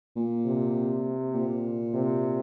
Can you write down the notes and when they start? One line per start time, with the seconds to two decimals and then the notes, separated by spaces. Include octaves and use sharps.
0.16 A#2
0.45 C3
1.34 A#2
1.94 C3